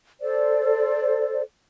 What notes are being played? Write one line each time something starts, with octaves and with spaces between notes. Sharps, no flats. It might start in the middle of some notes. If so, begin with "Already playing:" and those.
A4 C5 D5